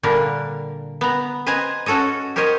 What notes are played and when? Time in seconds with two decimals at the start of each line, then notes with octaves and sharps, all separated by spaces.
0.03 A#2 D3 G3 D4 A#4
1.01 B3 A#5
1.46 B4 C5 D#5 G#5 A#5
1.86 C#4 F#4 A4 C#5 D#5
2.36 G4 A#4 C5 C#5 D#5